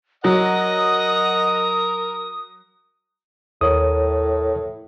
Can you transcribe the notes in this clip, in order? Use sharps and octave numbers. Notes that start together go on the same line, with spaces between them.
F#3 A#4 D#5 F#5 D#6
D#2 A2 A#4 C#5 D#6